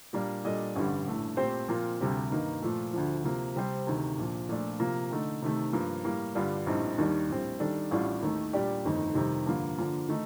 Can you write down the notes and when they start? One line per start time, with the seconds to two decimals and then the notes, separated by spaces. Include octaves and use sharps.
0.13 A#2 G3 A#3 D4
0.44 A#2 G3 D4 A4 D#5
0.75 A1 G2 D3 G3
1.07 A#1 A2 A3
1.37 A#2 A3 C4 G4 C5
1.68 A#2 F3 C4 F4 A#4
2.00 D2 C3 G3 C4
2.31 G2 D#3 A#3 D#4
2.62 A#2 F3 A3
2.93 D2 D3 F3
3.24 C3 F3 A#3
3.56 C3 G3 C4 G4 C5
3.87 D2 C3 D#3
4.17 A#1 A#2 F3
4.49 A#2 F3 A3 D4
4.80 C3 F3 A#3 F4
5.11 D3 A3 D#4
5.42 C3 D#3 A3
5.73 G2 F3 A#3
6.04 A2 G3 A#3
6.35 G2 D3 G3 D4 F4
6.66 A#1 A2 G3 C4 D#4
6.98 D#2 D#3 G3 D4
7.29 A#1 A2 G3 C4
7.60 D#3 G3 D4 A4
7.91 A1 A2 G3 D4 F4
8.22 D#2 D#3 A3 D#4
8.53 A#2 G3 D4 G4 D5
8.84 G1 F2 D#3 A3 D#4
9.15 F2 C3 D#3 G3
9.46 G2 D3 F3 A#3 F4
9.78 D3 F3 A#3 F4
10.09 D#3 A3 D#4